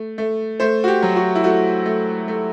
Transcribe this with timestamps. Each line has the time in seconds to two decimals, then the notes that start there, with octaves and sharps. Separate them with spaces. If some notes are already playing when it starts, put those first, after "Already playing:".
Already playing: A3
0.18 A3
0.60 A3 C5
0.84 F#4
0.88 G4
1.02 F#3
1.16 F#4
1.35 E4
1.44 A3 F#4
1.86 A3
2.28 A3